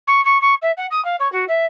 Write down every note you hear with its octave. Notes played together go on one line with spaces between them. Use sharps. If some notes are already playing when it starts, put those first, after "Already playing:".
C#6
C#6
C#6
E5
F#5
D#6
F5
C#5
F#4
E5